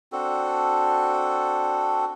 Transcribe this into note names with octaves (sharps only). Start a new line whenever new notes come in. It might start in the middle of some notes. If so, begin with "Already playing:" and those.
C4 D4 F#4 A4